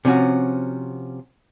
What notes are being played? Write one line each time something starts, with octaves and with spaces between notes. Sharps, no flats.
C3 F3 C#4 F#4